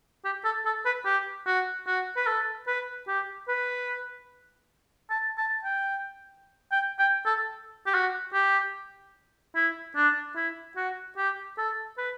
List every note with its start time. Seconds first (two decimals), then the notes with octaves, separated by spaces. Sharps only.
0.25 G4
0.44 A4
0.66 A4
0.86 B4
1.05 G4
1.47 F#4
1.87 F#4
2.16 B4
2.27 A4
2.67 B4
3.08 G4
3.48 B4
5.10 A5
5.38 A5
5.64 G5
6.72 G5
6.99 G5
7.26 A4
7.87 G4
7.94 F#4
8.34 G4
9.56 E4
9.96 D4
10.36 E4
10.76 F#4
11.17 G4
11.58 A4
11.98 B4